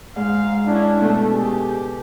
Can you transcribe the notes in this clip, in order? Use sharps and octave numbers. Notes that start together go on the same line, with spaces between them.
G#2 F5
C#4 D4 E4
B2 A3 A4
G4 G#4